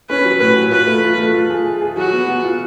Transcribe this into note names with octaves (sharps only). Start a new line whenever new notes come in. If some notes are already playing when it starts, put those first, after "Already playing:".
C#4 B4
F#3
A2 B4
F#3
F4 B4
A3
F4
A3
F4
G#4
G#4
G#4
F#3 F#4
B3
B3
F4